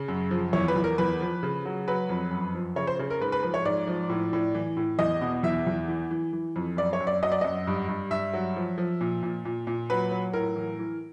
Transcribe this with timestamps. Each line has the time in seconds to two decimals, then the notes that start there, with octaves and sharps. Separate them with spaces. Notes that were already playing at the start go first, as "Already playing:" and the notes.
Already playing: C#3
0.08 F#2
0.31 F3
0.53 E2 C#5
0.68 B4
0.76 E2
0.84 A#4
0.98 E2 B4
1.21 F3
1.43 C#3
1.65 F#3
1.88 F#3 B4
2.09 F2
2.31 F#2
2.54 F3
2.76 C#3 C#5
2.87 C5
2.99 C#3
3.10 A#4
3.21 G#2 B4
3.32 B4
3.43 F3 B4
3.54 C#5
3.65 G#2 D5
3.87 F3
4.09 A2
4.33 A2
4.55 E3
4.77 A2
4.99 E2 D#5
5.21 B2
5.43 E2 E5
5.67 E2
5.88 E3
6.11 E3
6.33 E3
6.56 F2
6.77 F#2 D5
6.93 C#5
7.00 F#2
7.07 D5
7.23 F#3 D#5
7.32 D5
7.41 F#2 D#5
7.67 G2
7.88 G2
8.11 G2 E5
8.33 F#3
8.56 F3
8.78 F3
9.01 A#2
9.23 A#2
9.45 A#2
9.67 A#2
9.90 F#3 B4
10.11 F#3
10.33 A2 A#4
10.56 E3
10.79 E3